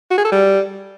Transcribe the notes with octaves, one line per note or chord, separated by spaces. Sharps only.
F#4
G#4
A4
G3